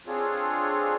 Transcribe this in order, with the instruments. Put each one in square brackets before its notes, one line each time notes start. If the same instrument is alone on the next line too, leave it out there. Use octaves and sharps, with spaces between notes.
[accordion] C4 D4 F4 G#4 A4 C#5